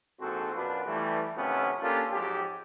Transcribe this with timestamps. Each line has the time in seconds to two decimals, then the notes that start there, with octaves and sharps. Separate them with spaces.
0.20 A#1 G#2 C4 F#4 A4
0.54 F#2 B2 D4 F4 B4
0.86 E3 G3 A3
1.35 G#1 F2 C3 A3 B3 C#4
1.81 A#3 C#4 D4 F4 G4 A4
2.11 F2 G#2 F#3 G4